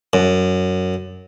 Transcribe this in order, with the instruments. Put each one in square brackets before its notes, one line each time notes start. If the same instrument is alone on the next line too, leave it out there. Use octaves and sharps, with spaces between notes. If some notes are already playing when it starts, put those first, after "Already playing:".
[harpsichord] F#2